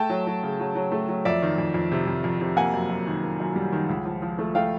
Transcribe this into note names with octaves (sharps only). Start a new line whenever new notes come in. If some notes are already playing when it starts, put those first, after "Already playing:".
Already playing: A3 G5 A5
F#3
F#3
C#3
F#3
F#3
A3
F#3
F2 D5 E5
D#3
F2
F2
C3
F2
F2
C3
A#3 F#5 G#5
F#2
F#2
D#3
A#3
F#2
G3
D#3
C#2
F3
F3
A3
A3 F5 G5